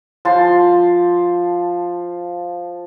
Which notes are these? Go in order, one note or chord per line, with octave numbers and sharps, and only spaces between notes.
F3 A5 C6